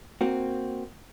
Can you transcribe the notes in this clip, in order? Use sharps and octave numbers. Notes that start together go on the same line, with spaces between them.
A#3 C4 F#4